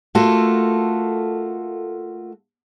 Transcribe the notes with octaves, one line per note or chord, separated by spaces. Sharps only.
A3 A#3 F4 F#4 A4